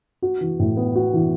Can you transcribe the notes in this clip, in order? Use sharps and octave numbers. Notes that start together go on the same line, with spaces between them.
F#4
E3
A2
B3
F#4
E3